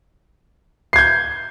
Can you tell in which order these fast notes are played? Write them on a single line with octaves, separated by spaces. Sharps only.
C7 G#6 G6